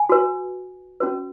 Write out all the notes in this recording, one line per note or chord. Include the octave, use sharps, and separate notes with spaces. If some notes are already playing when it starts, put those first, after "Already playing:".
Already playing: G#5
F#4 B4
C#4 F#4 B4